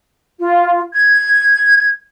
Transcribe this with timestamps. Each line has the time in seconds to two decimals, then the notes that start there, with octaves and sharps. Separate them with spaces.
0.38 F4
0.92 G#6